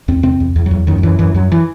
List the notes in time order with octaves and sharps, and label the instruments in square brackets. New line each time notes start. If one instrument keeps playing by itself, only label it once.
[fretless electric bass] E2 C4
C3 C4
E2
E2
E2 F#3
F#2 D#3
F#3
F#2 E3
F#2 E3
F#2 F#3
E3